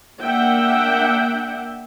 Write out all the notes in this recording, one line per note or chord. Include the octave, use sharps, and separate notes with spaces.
A#3 D4 E5 F#5 G5